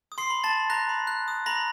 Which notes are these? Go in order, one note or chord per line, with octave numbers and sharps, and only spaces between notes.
D#6
C6 C7
B5
A5 A6
B5
A#5 F#6 A#6
B5
F#6
D#6
A#5 B5 A#6